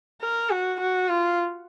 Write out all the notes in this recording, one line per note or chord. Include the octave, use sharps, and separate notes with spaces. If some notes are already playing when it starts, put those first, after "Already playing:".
A#4
F#4
F#4
F4